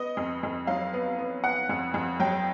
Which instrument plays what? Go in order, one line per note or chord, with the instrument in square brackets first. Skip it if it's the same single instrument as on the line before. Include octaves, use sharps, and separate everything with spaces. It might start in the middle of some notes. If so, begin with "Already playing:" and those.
Already playing: [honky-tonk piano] B3 D#5
F2
F2
F#3 F5
B3
B3
B3 F#5
F2
F2
F#3 G5